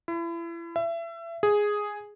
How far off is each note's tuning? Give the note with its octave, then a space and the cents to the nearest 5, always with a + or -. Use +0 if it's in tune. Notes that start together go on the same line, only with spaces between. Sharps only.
E4 +35
E5 +30
G#4 +0